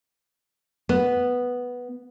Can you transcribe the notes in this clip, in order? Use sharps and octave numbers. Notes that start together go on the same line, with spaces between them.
B3